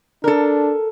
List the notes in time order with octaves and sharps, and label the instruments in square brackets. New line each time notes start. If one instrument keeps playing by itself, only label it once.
[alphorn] D4 [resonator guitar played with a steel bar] A4 A#4